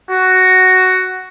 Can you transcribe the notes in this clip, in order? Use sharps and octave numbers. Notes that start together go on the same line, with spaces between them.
F#4